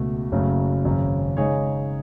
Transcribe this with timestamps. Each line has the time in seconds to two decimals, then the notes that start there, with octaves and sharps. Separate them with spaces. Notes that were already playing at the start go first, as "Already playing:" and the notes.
Already playing: C#2 B2 A3
0.32 F#1 F#2 C#3 F#3 A3
0.84 G#1 F#2 C#3
1.37 C#3 G#3 D#4 G#4 C#5